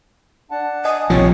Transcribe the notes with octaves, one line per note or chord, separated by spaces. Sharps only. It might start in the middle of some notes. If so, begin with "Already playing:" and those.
D4 F#5 A5
D#5 G#5 D#6
A#1 C3 F3 C#5